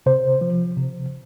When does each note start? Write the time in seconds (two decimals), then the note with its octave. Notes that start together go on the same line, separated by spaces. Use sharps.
0.06 C3 C5
0.41 F3
0.77 C3